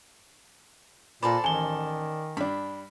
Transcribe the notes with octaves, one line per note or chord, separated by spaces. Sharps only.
A#2 A4 C5 D5 B5
A1 D#3 G#5 G7
G2 D4 B5